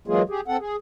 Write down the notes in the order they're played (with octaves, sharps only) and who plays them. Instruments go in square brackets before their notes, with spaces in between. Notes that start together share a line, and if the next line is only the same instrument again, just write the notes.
[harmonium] E3 F#3 G#3 A#3 F4 G#4
G4 G#4
C4 A4 F#5
G#4